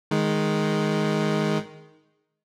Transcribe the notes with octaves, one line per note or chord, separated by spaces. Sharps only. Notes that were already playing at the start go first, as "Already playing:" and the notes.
D#3 G#3